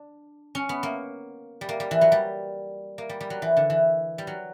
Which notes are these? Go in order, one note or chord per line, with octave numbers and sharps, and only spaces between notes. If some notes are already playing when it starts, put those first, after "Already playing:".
Already playing: D4
C#4
B3
A#3
G3
A#3
G3
E3
F#3
G3
A#3
G3
G3
F#3
E3
D3
E3
G3
F#3